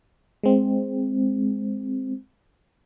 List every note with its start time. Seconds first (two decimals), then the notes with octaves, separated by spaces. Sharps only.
0.43 G#3 C4